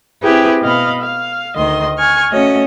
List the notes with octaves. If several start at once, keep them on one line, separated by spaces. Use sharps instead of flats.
C4 E4 G4 G#4 B4 G5
B2 D#5 F5 B5
F5
D2 D#3 D#5 C6
G#5 C#6 F6
A3 C#4 F#4 C#5 D#5